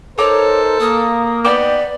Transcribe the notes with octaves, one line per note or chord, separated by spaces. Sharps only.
D#4 A4 A#4 C5 C#5 A#5 D6
A#3 D#6
B3 D#4 D5 G5 D6